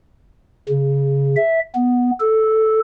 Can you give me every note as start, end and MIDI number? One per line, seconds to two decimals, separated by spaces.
0.69 1.36 49
1.36 1.60 76
1.75 2.11 59
2.20 2.80 69